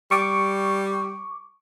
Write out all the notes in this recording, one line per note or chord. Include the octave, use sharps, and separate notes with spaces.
G3 C#6 D6